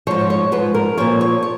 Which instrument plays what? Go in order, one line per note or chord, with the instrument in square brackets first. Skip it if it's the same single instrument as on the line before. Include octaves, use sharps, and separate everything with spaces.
[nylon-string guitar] G#2 F3 C#5
C#5
G#2 F3 B4
A#4
A#2 F3 C#5
C#5
C#5